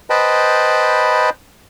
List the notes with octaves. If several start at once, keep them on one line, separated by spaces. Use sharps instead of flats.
B4 C5 D#5 G5 A5 B5